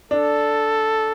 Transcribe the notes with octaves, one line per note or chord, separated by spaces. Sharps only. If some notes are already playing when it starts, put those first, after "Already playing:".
D4 A4